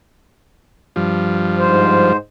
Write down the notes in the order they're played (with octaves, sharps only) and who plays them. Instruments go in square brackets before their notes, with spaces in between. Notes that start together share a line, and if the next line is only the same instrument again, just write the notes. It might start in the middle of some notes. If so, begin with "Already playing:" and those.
[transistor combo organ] G2 F3
[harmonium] G#2 C5